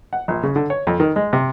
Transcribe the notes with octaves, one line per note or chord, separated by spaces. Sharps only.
F#5
A#1
C#3
D3
C#5
F2
D#3
G#3
C3